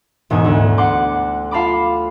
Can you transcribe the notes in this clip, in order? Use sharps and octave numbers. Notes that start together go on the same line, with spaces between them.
E1 E2 G#2 G#5
D2
F#5 C6 D6
F4 F5 A5 B5 D6